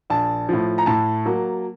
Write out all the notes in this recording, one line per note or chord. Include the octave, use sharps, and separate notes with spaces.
A#1 A5
A2 F3
A#5
A2 A5
F#3 A#3